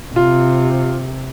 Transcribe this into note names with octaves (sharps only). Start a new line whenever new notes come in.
C3 F4